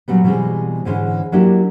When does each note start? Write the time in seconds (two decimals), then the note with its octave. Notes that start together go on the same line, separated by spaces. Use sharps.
0.08 A#2 F#3 G3 B3
0.24 B2 E3 G3 G#3 C4
0.85 G#2 D3 E3 G#3 C#4
1.32 F#3 G#3 A#3 D4 E4 G4